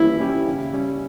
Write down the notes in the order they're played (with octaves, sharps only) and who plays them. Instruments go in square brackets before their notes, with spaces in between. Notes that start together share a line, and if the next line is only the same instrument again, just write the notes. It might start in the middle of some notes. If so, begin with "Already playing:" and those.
Already playing: [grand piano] E3 G3 C#4 G4 [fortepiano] E4
[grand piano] G3 C#4 G4
C#3
G3 C#4